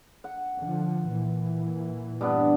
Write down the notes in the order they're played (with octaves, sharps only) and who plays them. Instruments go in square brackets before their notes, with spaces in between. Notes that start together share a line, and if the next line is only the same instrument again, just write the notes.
[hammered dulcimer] F#5
[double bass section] D3 F3
A#2 E3
[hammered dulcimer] G2 B3 D4